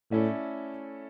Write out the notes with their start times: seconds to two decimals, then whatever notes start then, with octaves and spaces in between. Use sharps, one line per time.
0.11 A2 A3 C#4 E4 A4 D5